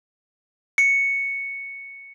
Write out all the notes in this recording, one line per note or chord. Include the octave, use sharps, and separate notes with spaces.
C#7